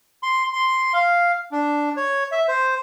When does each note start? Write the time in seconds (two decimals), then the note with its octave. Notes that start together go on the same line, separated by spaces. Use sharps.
0.23 C6
0.53 C6
0.94 F5
1.52 D4
1.97 C#5
2.32 E5
2.48 C5